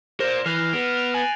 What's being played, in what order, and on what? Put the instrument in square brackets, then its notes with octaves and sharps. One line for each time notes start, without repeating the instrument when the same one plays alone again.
[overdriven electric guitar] A#4 D5 [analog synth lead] C5 [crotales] A#6 E7 G7
[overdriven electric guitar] E3 [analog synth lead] F6 [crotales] F#6 C7
[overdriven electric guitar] B3 [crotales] A#6 D7
[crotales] D7 F7
[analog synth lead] G#5 [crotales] A6 F#7